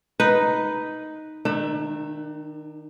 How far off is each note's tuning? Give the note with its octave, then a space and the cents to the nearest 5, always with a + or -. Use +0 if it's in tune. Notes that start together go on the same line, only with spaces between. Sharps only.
D#4 +0 B4 +0
D#3 +0 D4 +40 E5 +10